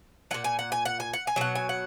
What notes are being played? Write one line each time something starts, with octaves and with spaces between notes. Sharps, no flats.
A#2 F#3 F#5
G#5
F#5
G#5
F#5
G#5
F#5
G#5
B2 F#3 F#5
G#5
F#5